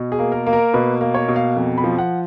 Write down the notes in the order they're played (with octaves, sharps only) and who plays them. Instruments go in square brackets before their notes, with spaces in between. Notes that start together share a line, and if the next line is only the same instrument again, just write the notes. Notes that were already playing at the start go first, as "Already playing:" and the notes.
Already playing: [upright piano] B2
G#4
A#3
A#4
A#3
A#4
B2 B4
A#3
C#5
B2
F5
F2
B5
F3
F#5